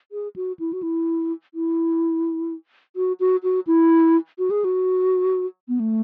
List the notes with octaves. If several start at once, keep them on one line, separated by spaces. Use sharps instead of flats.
G#4
F#4
E4
F#4
E4
E4
F#4
F#4
F#4
E4
F#4
G#4
F#4
B3
A3